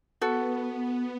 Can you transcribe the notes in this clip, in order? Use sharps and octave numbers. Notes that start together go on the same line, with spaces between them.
B3 F#4 A4